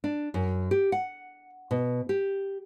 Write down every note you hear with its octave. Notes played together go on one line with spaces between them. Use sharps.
D4
F#2
G4
F#5
B2
G4